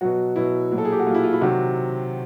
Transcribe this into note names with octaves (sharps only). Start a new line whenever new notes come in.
B2 F#3 F#4
B2 F#3 E4
A#2 F#3
A4
G#4
G4
F#4
A#2 F#3 F4
E4
F4
E4
C3 D#3 F#3 F#4